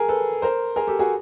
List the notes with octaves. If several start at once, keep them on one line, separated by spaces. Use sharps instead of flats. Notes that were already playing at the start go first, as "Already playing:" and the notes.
Already playing: G#4 A#4
A4 B4
A#4 C5
G#4 A#4
G4 A4
F#4 G#4